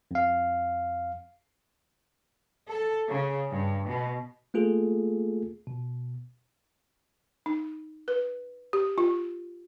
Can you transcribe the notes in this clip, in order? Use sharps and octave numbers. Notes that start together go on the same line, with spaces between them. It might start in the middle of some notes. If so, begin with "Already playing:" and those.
F2 F5
A4
C#3
G2
B2
A3 A#3 F4 G#4 A4
B2
D#4
B4
G4
F4